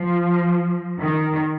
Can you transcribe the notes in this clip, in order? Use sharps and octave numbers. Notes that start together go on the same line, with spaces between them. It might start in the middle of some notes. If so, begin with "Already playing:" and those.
Already playing: F3
D#3